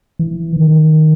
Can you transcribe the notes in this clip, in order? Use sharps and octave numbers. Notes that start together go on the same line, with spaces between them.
E3
D#3